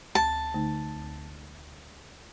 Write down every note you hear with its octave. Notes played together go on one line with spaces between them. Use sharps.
D2 A5
D3 A3 D#4
D2